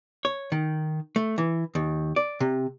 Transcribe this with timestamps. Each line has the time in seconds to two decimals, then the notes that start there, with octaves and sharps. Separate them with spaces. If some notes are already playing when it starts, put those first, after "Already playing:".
0.25 C#5
0.52 D#3
1.16 A3
1.38 E3
1.75 D#2
2.16 D5
2.40 C3